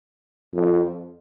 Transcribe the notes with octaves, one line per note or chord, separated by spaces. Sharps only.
F2